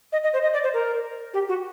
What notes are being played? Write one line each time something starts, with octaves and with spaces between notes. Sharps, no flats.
D#5
D#5
C5
D#5
D5
C5
A#4
G4
F#4